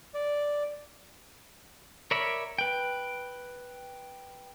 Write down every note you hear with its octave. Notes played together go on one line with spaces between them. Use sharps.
D5
A#4 C#5 D5 E5 B5
B4 G5